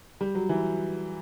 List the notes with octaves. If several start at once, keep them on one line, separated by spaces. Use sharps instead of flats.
G3
F#3
E3